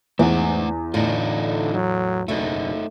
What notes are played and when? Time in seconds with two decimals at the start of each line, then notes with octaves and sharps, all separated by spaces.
0.19 E2 G#2 A3 C4 F#5
0.94 A2 D3 D4 D#4 F4
1.74 F#3
2.28 F#1 D2 B2 D3 A3 D#4